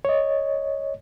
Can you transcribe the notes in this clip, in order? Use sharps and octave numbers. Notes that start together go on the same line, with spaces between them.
C#5 D#5